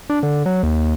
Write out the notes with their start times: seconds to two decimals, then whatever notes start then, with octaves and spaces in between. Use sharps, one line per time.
0.10 D4
0.23 D3
0.46 F#3
0.63 D#2